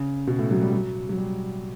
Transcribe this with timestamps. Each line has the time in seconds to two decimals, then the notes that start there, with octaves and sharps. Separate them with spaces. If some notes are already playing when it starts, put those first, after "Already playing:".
Already playing: C#3
0.27 B2
0.39 A2
0.51 F#3
0.62 G3
0.72 F#3
1.09 F#3
1.17 G3